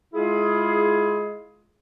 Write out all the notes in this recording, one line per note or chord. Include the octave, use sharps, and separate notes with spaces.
G#3 E4 F4 G#4